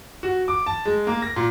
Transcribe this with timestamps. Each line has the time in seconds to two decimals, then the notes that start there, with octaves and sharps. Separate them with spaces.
0.23 F#4
0.48 D6
0.66 A5
0.85 G#3
1.07 A#3
1.22 A#6
1.36 A#2